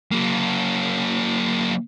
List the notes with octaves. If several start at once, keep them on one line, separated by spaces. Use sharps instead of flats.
F#3 A#3